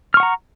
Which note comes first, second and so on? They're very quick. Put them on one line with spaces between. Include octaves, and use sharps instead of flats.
F6 C#6 F#5 A#5